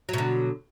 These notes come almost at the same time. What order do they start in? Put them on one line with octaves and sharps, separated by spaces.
F#3 B2 D3